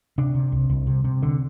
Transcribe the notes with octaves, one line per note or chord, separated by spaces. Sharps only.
C3 D4
C3
C2
C2
C3
C3
D3